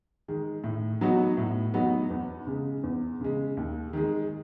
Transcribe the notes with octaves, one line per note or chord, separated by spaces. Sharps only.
D#3 G#3
A2
F#3 B3 D#4 F#4
A2
F#3 B3 D#4 F#4
E2
C#3 G#3
E2
C#3 G#3
D#2
D#3 G#3